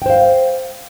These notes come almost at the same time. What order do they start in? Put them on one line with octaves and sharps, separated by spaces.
G5 C5 F5